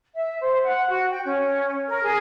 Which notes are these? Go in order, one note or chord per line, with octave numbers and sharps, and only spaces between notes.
E5
C5
F#5
F#4
G5
C#4
A#4
G#4